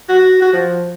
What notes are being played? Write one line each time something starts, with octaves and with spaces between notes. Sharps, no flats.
F#4
F#4
F3